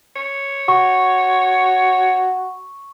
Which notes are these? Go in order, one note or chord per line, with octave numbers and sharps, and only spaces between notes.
C#5
F#4 C#6